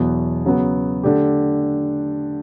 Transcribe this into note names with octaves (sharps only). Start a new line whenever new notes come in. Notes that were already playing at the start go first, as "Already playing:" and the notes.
Already playing: E2 B2 F#3 B3
C#3 F#3 B3
D3 A3 D4 G4